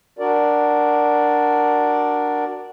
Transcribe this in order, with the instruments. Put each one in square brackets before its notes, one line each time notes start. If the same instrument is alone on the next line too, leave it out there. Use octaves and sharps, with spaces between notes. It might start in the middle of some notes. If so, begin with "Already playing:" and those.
[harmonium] D4 F#4 A#4 D5